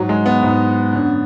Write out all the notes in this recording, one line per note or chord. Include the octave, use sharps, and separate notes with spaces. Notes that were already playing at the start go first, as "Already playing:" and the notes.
Already playing: G#2 F#3
G#3
B3
G#2
F#2 D3